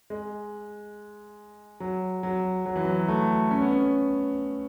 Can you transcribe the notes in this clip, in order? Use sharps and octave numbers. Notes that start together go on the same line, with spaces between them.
G#3
F#3
F#3
F#3
E3
F#3
A3
C#4
B3
C#4